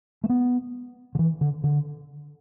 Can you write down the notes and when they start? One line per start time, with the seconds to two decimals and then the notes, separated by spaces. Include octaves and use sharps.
0.24 A3
0.29 B3
1.15 D3
1.19 E3
1.41 D3
1.64 D3